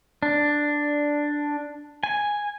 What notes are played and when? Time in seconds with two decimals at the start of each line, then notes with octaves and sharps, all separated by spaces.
0.23 D4
2.03 G#5